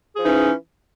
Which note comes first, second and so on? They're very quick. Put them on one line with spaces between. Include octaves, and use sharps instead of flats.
G#4 F3 E3 D#4 C#4